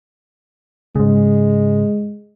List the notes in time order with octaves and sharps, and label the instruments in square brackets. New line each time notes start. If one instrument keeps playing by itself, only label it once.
[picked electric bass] G#2 C#3 [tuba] G#3